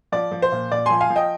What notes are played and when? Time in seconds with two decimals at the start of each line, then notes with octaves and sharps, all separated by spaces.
0.12 F3 D5
0.32 F3
0.42 C5
0.52 A#2
0.71 A#2 D5
0.86 F3 G#5 C6
1.01 F5 G#5
1.10 F3
1.16 D#5 G5